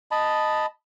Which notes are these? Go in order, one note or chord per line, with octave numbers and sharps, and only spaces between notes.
D#5 A5 B5